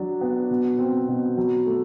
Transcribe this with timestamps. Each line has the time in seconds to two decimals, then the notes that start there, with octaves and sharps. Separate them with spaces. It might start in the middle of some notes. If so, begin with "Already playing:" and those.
Already playing: F#3 D4
0.21 B3
0.50 B2
0.79 C4
1.08 B2
1.37 F#3
1.66 A3